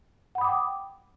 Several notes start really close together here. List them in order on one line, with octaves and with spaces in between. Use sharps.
F#5 B5 D#6 D6 G5